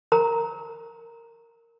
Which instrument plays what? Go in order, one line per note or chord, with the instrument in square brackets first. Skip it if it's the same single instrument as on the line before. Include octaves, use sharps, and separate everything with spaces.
[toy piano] A#4 A#5